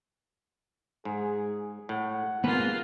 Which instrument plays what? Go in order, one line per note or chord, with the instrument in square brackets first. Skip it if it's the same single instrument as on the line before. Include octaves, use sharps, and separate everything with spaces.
[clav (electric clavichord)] G#2 [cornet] G#4
[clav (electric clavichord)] A2 [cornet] F#5
[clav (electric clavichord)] G#2 B4 [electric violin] A#3 F4 [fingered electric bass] B3